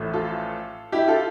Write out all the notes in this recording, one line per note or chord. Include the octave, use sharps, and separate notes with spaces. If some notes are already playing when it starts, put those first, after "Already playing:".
Already playing: A1 A2 F3 A3
F4 A4
E4 G4
F4 A4